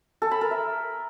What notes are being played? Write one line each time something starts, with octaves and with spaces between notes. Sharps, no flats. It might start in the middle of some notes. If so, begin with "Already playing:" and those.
A4
B5
A#4
E5